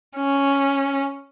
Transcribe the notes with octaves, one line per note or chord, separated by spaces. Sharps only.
C#4